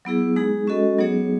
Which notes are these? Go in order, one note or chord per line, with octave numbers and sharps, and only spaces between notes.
F#3 B3 E4 G#4
G#3 D#4 G#4
G#3 C#4 F#4 A4 D#5
F#3 B3 D#4 G#4 C#5